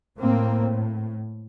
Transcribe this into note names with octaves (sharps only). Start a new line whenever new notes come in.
A2 A#3 C4